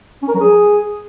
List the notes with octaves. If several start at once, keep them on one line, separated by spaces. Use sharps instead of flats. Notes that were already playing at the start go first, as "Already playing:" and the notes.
C#4
A#4
F#3
G#4